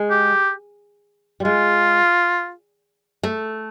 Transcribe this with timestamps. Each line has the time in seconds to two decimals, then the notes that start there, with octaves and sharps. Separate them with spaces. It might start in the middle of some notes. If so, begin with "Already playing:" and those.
Already playing: G#3
0.11 G4
1.40 G3
1.45 G#3 F4
3.23 A3